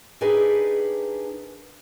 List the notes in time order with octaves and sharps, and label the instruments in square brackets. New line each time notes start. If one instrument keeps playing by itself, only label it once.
[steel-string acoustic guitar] D4 D#4 G4 G#4 A#4 B4